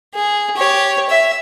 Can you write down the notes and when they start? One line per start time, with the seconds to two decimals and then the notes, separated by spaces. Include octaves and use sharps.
0.15 G#4
0.57 G4 C#5
1.10 E5